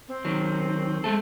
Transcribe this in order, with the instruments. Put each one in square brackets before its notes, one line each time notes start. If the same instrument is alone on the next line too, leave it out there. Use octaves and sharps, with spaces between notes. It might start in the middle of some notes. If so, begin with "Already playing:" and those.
[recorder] C4
[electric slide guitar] D#3 F#3
G#3 A3 A4